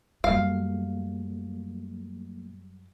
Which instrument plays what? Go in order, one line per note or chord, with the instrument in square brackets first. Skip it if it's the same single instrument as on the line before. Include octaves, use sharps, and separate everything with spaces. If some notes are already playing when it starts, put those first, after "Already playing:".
[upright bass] F#2 G3 [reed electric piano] F#3 A3 A#3 [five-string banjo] F5